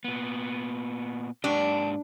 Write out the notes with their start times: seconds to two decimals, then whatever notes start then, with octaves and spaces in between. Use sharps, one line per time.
0.04 A#2 B3
1.44 G#2 A#3 D4 G4